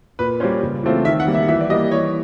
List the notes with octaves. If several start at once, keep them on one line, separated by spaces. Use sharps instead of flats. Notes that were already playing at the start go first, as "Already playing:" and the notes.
A#2 B4
G3 A#3 C#4 C5
C#3
E3 A3 C4 F4
D#3 E5
F#5
G3 A#3
E5
E3 E5
D5
G3 A#3 D#5
E3 C#5